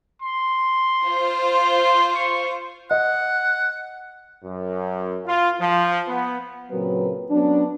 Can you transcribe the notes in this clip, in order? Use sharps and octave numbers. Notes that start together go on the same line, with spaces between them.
C6
F4 C5
C6
C#6
D#5 F#5
F#2
F4
F3
B3
A#2 C#3 F#3 C4 A#4 B4
F#3 B3 C#4 D4